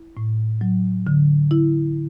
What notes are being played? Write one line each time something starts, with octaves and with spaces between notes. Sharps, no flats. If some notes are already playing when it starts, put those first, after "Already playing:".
Already playing: E4
A2
F#3
D3
E4